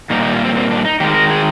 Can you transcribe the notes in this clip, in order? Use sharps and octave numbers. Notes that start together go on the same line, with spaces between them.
A#2 G3 A#3 D#4
D#4
F4
C4
C4
D4
D#4
D#3 G#3 G4
A#4
G#4